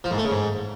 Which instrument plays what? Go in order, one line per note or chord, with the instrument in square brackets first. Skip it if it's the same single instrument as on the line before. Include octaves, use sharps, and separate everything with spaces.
[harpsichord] F3
G#2
A3
C#3
G#2